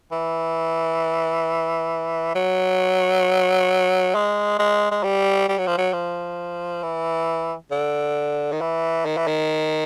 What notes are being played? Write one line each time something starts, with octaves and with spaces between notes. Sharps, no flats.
E3
F#3
G#3
G#3
G#3
G3
G3
F#3
F3
F#3
F3
E3
D3
D#3
E3
D#3
E3
D#3